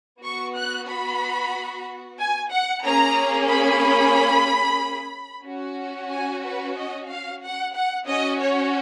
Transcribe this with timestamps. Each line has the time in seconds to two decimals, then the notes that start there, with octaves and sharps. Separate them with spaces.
0.23 B3 F#4 C#6
0.56 F#6
0.88 B5
2.19 G#5
2.52 F#5
2.84 A#3 C#4 G#4 A#5
3.50 B5
5.46 C#4 F#4
6.11 G#5
6.44 B4
6.76 D#5
7.09 F5
7.43 F#5
7.75 F#5
8.08 C#4 F#4 D#5
8.40 C#5